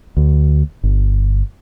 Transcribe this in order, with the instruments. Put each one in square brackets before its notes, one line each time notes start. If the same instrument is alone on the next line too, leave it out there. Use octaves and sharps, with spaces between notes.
[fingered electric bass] D2
G1